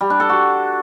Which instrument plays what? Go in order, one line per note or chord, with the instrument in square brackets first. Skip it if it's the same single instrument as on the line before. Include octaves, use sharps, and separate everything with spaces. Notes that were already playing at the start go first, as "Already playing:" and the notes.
[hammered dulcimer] G3
D4
A4
F#4